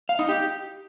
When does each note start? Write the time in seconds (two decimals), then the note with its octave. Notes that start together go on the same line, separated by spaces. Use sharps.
0.09 F5
0.19 D#4
0.29 G4